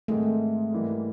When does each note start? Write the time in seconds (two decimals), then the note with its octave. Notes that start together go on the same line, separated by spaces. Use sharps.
0.08 G#2 D#3 G#3 A3 C4
0.72 G#2 E3 G3 A#3